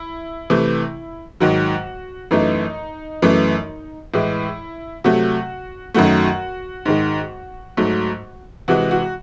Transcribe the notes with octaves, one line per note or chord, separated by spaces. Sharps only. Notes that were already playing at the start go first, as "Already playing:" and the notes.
Already playing: E4
C3 E3 A3
G#2 D#3 F#3 F#4
F#2 E3 A3 D#4
F#2 E3 A3
A2 E3 G#3 E4
C3 F#3 A3 F#4
F#2 D#3 F#3 A3 F#4
G#2 D#3 G#3
G#2 F#3 A3
C3 E3 G#3 F#4
F#4